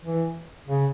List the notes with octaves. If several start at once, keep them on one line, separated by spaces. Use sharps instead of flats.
E3
C#3